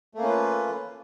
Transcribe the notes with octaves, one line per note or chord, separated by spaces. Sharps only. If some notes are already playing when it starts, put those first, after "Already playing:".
A3 A#3 C#4 F4 B4